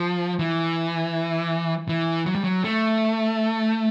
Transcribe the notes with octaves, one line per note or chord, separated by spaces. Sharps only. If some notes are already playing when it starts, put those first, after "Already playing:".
Already playing: F3
E3
E3
F#3
G3
F#3
A3